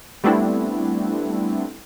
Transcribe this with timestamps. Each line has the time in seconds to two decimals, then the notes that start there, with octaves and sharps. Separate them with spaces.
0.24 G3 A3 B3 C4 D4 E4